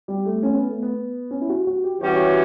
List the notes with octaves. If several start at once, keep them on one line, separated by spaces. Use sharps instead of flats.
G3
A3
C#4
B3
A3
B3
C#4
E4
F#4
F#4
G4
E3 G3 C#4 F#4 G4 C#5
G4